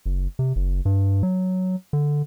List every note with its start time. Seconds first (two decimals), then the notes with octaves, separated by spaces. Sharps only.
0.06 F#1
0.39 C3
0.56 F#1
0.85 G2
1.23 F#3
1.93 D3